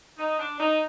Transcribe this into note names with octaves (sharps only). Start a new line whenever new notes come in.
D#4
D4
D#4